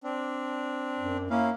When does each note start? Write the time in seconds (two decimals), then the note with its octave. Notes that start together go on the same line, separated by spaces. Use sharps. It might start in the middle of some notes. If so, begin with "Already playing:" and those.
0.04 C4 D4
0.99 F#2
1.30 A#3 C#4 E4 F5